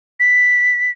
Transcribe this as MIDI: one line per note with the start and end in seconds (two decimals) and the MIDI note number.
0.20 0.91 95